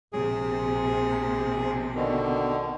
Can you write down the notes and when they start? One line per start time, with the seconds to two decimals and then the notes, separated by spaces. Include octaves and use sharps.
0.13 A#1 C3 G#4
1.95 B2 D3 D#3